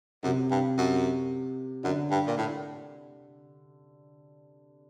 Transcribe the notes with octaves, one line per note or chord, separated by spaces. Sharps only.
F#2 C3
G2
F#2
F#2 D3
G2
A#2
A2